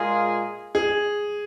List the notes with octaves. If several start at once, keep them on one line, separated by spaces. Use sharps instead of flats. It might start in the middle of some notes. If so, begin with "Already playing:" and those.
Already playing: A#2 G#3 F4 G#4
G#4